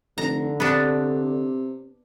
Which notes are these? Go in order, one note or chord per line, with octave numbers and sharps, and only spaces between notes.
F1 D3 A#5
C3 B3 D4